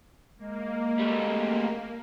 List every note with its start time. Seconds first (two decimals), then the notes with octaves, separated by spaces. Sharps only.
0.38 G#3 A#3
0.99 G3 A3